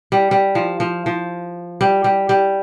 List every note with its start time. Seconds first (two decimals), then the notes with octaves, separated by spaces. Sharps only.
0.12 G3
0.31 G3
0.55 F3
0.80 F3
1.06 F3
1.81 G3
2.04 G3
2.29 G3